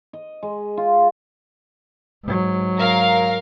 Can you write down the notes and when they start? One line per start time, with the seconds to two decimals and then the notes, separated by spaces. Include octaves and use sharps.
0.13 D#5
0.43 G#3
0.77 F4
2.24 G#2 F#3
2.78 A#4 F5